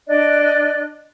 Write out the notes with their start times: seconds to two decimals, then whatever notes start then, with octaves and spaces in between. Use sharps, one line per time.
0.08 D4 D5 D#5 F#6